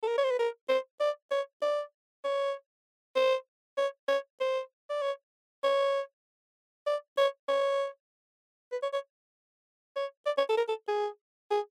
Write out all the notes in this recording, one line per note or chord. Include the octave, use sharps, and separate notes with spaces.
A4
A#4
C#5
C5
B4
A#4
C5
D5
C#5
D5
C#5
C5
C#5
C#5
C5
D5
C#5
C#5
D5
C#5
C#5
B4
C#5
C#5
C#5
D5
C#5
A4
A#4
A4
G#4
G#4